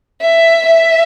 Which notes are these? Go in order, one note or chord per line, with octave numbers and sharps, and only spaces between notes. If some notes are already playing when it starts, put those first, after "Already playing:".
E5
E5